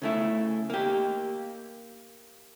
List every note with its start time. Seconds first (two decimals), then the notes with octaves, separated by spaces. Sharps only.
0.02 C#3 A3 E4
0.70 A#3 G4